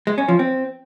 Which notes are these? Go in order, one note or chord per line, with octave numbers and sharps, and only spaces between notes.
G#3
C#4
F3
C4